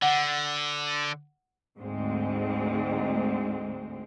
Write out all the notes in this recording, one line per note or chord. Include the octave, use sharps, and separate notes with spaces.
D3 F#5
D2 G#2 G#3 C4